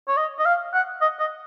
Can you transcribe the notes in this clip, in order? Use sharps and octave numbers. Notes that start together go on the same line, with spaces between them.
C#5
D#5
D#5
F5
F#5
D#5
D#5